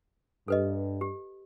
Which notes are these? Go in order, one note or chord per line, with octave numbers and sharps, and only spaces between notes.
G2 A4 B4 D#5
G4